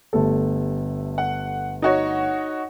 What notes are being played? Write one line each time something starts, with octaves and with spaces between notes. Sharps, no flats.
G1 A3 A4
F#5
D#4 F#4 C#5